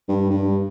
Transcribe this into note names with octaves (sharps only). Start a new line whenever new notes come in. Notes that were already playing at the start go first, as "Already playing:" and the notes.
G2
G2